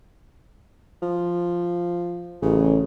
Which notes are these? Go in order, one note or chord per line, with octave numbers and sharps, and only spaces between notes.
F3
A1 C#3